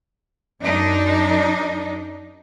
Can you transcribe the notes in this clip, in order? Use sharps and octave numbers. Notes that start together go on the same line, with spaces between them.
F#2 D4 D#4